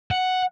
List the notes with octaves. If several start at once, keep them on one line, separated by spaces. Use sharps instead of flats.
F#5